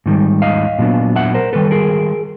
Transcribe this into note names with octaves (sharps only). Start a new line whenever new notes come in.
G#2 D#3 G3
D#5 F5
A#2 F#3 B3 D4
E5 F#5
A#4 C5
D#3 G3 A4 B4
G#4 A#4